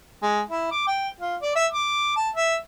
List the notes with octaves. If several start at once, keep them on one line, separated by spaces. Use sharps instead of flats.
G#3
E4
D6
G5
F4
D5
E5
D6
A5
E5